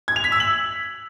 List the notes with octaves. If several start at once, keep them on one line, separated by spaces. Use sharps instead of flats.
G#6
F7
B6
E6
F#7